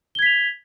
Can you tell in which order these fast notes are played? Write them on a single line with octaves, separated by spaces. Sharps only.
G7 G#6 B6 F7